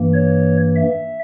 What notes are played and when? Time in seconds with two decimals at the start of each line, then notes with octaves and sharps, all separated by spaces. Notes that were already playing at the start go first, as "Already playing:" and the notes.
Already playing: G2 E3 A#3
0.14 C#5
0.76 E5